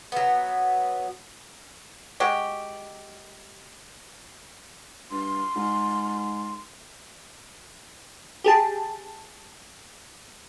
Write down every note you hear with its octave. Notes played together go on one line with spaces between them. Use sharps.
F#3 B3
G#3 F#4 G4
G2 C6
G#2
G4 G#4 A5